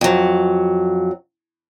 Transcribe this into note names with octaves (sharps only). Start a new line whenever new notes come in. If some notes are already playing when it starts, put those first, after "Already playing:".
F2 F#3